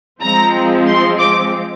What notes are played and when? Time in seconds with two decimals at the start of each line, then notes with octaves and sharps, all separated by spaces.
0.21 F3 G#3 C4 A#5
0.87 C6
1.19 D6